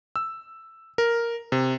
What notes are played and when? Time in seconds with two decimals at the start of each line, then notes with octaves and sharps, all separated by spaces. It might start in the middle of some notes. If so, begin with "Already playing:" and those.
0.16 E6
0.98 A#4
1.52 C3